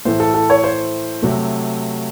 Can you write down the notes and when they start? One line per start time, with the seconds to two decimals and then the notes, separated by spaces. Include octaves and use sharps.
0.05 A2 E3 A3 C5
0.20 A4
0.34 A4
0.50 C#5
0.64 C5
1.22 C3 F#3 A3